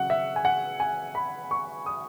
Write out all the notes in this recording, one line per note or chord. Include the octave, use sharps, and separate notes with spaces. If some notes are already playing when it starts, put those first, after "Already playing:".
Already playing: C#3 F#3 F#5
E5
G#5
F#5
G#5
B5
C#6
D#6